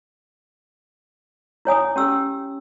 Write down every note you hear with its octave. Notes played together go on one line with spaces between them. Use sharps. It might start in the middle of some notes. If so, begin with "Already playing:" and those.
E4 C#5 G#5 D#6
C#4 G4 E6